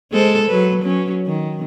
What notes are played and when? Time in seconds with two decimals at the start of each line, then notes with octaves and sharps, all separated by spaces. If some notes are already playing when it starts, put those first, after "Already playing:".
0.12 G#3 A4 C5
0.47 F#3 B4
0.82 F#3 C#4
1.26 D#3